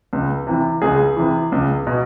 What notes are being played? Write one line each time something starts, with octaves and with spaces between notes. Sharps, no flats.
C#2
C3 E3
C#2 G#4
C3 E3
C#2
B2